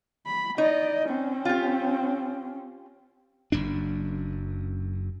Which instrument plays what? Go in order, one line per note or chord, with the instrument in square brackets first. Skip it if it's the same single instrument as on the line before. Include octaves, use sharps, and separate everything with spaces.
[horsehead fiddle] B5
[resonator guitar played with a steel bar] D#4 [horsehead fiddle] D5 D#5
[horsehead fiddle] C4 C#4
[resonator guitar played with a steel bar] F4 G4
[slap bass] F#1 F#2 D4